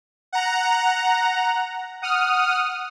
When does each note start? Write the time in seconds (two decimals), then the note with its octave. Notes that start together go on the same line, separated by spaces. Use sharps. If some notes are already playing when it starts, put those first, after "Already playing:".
0.33 F#5 A#5
2.02 F#5 D#6 F6